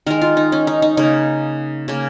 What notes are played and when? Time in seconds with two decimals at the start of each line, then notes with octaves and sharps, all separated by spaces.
0.07 D#3 G#3 A#4
0.22 F4
0.37 D#4
0.52 C#4
0.67 D#4
0.82 D#4
0.97 C#3 A#3 D#4
1.88 C#3 A#3